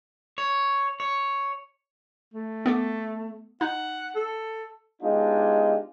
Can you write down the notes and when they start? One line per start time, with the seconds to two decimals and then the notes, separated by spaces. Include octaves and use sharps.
0.38 C#5
1.00 C#5
2.34 A3
2.66 B3 A4 D6
3.61 D#4 F#5
4.15 A4
5.01 G#3 B3 D4 D#4 F4 G4